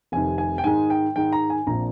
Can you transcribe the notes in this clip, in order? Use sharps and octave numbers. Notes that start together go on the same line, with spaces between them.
F1 F2 C3 D#3 G#5
G#5
G5
G#2 D#3 G#3 D#4 G#5
G5
G#2 D#3 G#3 D#4 G5
A#5
G#5
A#1 A#2 F3 C4 A#5